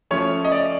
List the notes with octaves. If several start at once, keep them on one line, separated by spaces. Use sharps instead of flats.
F3 A3 C#4 C#5
D#5
D5